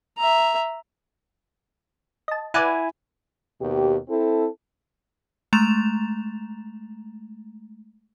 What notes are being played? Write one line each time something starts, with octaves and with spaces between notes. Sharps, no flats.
E5 A#5
D#5 A5
E4 B4 D5 F#5 G#5
D#2 B2 G4
C4 E4 A4
G#3 A3 A#5 A6 E7 F7